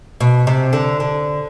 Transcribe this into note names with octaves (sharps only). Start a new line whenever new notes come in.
B2
C3
D3
D3